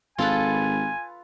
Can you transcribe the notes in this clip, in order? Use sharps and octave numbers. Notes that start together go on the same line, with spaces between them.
G#1 F4 A4 B4 G#5